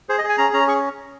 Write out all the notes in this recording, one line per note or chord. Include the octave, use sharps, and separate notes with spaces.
G#4 C5
D#5
G#4
G#5
C#4 A#5
C#4 A#5
G#4 C#6